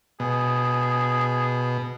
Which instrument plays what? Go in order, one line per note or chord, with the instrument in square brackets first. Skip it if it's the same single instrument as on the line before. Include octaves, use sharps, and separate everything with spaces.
[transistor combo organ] B2 [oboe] G#4